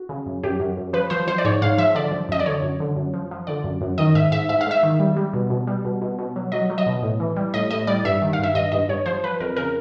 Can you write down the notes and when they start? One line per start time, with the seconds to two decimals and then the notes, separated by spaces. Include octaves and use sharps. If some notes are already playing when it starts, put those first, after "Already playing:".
Already playing: F#4
0.09 C#3
0.26 F#2
0.44 F#2 G4
0.60 F#2
0.77 F#2
0.93 F3 B4
1.10 F3 C5
1.27 F3 C5
1.38 D5
1.45 G#2 C#5
1.62 G#2 F5
1.78 F3 E5
1.95 D3 D5
2.12 F3
2.29 F#2 D#5
2.40 D5
2.46 D3 C#5
2.63 F#2
2.80 D3
2.96 F#2
3.14 F3
3.31 F3
3.47 D3 D5
3.64 F#2
3.81 F#2
3.98 D#3 D#5
4.15 G#2 E5
4.32 G#2 E5
4.49 G#2 E5
4.61 F5
4.66 G#2 E5
4.83 D#3
5.00 G3
5.17 G3
5.34 B2
5.50 B2
5.67 G3
5.85 B2
6.02 B2
6.19 B2
6.36 F#3
6.52 F#3 D#5
6.70 F#3
6.78 D#5
6.86 B2
7.03 A2
7.20 E3
7.36 G3
7.54 A2 D#5
7.71 A2 D#5
7.87 G3 D5
8.05 G2 E5
8.22 D#3
8.33 F5
8.39 G2 E5
8.55 G2 D#5
8.72 G2 D#5
8.89 G2 C#5
9.06 F3 C5
9.24 F3 B4
9.40 F2 A#4
9.57 C#3 A#4